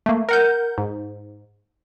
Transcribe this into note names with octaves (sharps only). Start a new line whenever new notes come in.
A3 A#3
A#4 F#5 G6
G#2